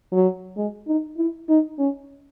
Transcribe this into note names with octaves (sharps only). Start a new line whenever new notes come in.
F#3
G#3
D#4
E4
D#4
C#4